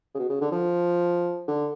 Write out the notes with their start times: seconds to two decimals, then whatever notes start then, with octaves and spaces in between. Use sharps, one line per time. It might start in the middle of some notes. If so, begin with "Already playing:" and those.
0.15 C#3
0.19 B2
0.29 C#3
0.41 D3
0.51 F3
1.47 D3